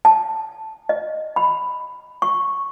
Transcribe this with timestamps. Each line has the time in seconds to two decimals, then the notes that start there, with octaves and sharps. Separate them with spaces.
0.05 A5
0.89 D#5
1.36 B5
2.22 C#6